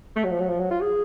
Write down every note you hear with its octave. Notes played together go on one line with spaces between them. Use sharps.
A3
F#3
F3
F#3
F3
F#3
F4
G#4